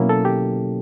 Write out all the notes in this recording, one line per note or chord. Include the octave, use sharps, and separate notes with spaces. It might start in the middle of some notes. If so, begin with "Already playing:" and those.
Already playing: B2 F#3 A#3 C#4 E4
A4
G4